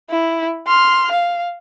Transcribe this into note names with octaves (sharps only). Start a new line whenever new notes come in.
E4
C6 F6
F5